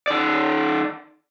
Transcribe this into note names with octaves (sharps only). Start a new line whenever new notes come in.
D#3 D5